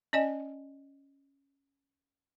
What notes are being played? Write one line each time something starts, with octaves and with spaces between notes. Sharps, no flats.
C#4 D5 D#5 G#5